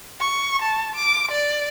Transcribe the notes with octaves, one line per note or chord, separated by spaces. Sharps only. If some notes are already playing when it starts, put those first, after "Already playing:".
C#6
A5
D6
D5